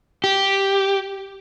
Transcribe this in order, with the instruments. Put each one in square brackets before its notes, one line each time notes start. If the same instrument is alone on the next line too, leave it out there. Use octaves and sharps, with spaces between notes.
[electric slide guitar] G4